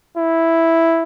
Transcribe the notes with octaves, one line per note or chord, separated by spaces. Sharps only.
E4